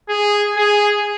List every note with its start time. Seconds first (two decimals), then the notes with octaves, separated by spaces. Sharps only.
0.09 G#4
0.57 G#4